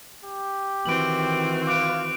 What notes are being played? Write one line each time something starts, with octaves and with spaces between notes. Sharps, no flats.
G4
D#3 E3 C4 F#4 D7 F#7
F4 D6 F#6 D7